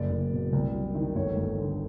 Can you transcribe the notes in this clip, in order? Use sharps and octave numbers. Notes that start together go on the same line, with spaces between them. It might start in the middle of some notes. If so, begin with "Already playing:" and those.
Already playing: F#1 D5
F#1
B2
C2
F#3
D#3
G1 C#5
G1
D3